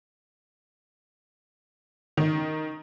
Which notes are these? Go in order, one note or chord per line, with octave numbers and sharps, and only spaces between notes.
D#3